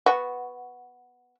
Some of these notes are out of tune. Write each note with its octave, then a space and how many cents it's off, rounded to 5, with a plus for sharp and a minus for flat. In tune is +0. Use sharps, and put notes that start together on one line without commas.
B3 +0 F#4 +0